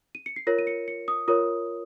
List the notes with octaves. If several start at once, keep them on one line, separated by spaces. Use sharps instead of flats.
D#7
C#7
C7
F4 A#4 C#5 A#6
D#7
C#7
C#7
D#6
F4 A#4 C#5 D#6